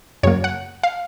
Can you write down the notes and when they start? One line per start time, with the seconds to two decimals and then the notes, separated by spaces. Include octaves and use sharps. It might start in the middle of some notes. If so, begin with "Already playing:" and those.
0.23 F#2 C#3 F#3 A#3 C#5
0.44 F#5
0.83 F5